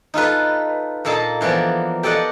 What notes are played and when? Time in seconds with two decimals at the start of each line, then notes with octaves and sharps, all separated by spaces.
0.14 D#4 F4 A4 B4
1.05 A#2 A#3 A4 D#5 A5
1.41 E3 F3 A#3 B3 D5
2.03 G4 A4 D5 D#5 F#5